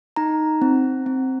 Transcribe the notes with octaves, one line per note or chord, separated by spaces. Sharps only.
D#4 A#5
C4
C4